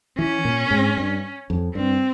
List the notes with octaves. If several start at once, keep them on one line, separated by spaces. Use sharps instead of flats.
E3 C#4
A#2
G#2
G2
F2
G2 C4